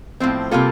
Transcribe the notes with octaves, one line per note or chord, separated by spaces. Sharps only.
A2 F3 C4
C3 G3 A#3 F4 A4